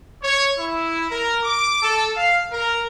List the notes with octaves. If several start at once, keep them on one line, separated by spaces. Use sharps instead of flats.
C#5
E4
A#4
D6
A4
F5
A#4